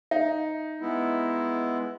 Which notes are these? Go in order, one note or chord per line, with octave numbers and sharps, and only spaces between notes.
D#4 E5
G#3 B3 E4